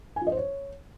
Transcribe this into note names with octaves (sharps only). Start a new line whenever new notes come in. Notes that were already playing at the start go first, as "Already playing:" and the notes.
G#5
F4
D#5
C5
C#5